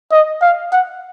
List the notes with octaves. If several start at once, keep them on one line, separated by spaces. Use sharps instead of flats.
D#5
F5
F#5